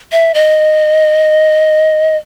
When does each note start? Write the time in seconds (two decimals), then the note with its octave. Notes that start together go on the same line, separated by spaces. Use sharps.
0.12 E5
0.34 D#5